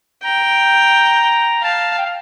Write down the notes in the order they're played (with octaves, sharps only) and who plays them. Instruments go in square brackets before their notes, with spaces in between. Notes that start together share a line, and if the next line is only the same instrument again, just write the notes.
[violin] G5 [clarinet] A#5
[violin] F5 [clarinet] A5
[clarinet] G5
F5